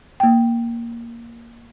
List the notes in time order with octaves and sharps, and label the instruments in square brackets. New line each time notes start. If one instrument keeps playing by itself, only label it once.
[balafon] A#3 G5